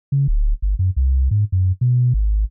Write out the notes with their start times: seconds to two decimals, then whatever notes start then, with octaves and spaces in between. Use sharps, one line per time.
0.12 C#3
0.28 D1
0.62 G1
0.79 F#2
0.96 C2
1.31 G#2
1.52 F#2
1.81 B2
2.14 G#1